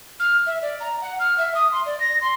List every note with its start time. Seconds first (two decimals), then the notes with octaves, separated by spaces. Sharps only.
0.20 F6
0.47 E5
0.62 D5
0.80 A#5
1.02 F#5
1.20 F6
1.38 E5
1.55 D#6
1.72 C6
1.86 D5
2.00 A#6
2.21 C6